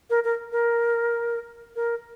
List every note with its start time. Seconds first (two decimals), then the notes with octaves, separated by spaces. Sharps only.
0.10 A#4
0.24 A#4
0.52 A#4
1.76 A#4